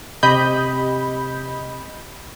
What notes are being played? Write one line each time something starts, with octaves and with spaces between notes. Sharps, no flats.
C3 G4 D#5 B5 G6